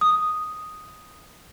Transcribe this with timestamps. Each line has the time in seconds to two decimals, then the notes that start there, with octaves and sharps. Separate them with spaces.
0.01 D#6